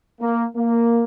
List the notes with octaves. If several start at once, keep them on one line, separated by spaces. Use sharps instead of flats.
A#3
A#3